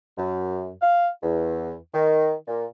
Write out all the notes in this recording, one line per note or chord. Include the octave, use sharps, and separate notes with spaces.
F#2
F5
E2
D#3
A#2